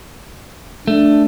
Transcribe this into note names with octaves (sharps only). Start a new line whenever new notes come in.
A3 D4